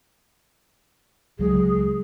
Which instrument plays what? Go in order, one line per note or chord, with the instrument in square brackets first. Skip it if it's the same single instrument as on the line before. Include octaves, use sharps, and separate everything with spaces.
[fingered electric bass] C#2 F#3 G#3 [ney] G#4